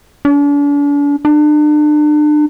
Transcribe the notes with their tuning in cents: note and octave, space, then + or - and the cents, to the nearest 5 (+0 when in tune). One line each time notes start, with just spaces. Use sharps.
D4 -40
D4 +35